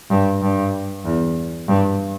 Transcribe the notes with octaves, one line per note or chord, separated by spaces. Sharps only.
G2
G2
E2
G2